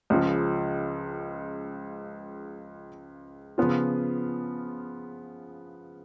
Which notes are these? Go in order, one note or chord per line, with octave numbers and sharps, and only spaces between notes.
C#2 C#3 F3
C#3 F3 B3 F4